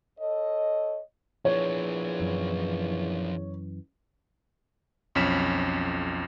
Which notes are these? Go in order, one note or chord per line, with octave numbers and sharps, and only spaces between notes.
A4 C#5 D#5
E2 F3 D4 C#5
F#2 E3
B1 F2 C#4 B6 E7